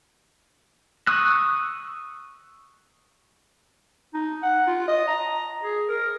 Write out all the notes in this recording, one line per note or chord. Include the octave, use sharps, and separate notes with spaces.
C#6 D#6 E6 F#6
D#4
F#5
F4
D#5
A#5
G#4
A#4